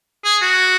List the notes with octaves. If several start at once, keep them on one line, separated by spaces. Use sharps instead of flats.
G#4
F#4